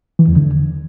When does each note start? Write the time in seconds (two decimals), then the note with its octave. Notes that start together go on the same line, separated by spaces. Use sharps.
0.19 E3
0.28 E2
0.36 D3